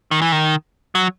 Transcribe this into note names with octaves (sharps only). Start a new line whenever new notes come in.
D#3
E3
D#3
F#3